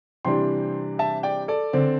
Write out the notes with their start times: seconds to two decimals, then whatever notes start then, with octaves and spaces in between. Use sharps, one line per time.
0.25 C3 E3 G3 D4 G5 C6
0.99 E5 A5
1.23 D5 G5
1.48 A4 D5
1.73 D3 C4